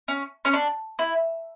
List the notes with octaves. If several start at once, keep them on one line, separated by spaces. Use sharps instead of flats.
C#4
C#4
D4
E4